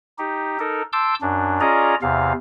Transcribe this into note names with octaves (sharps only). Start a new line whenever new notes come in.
D#4 G4
D#4 A4 A#4
A5 C6 D6 E6 G6
F#2 D4
C#4 F4 G#4 D5 D#5 A#5
E2 C3 F5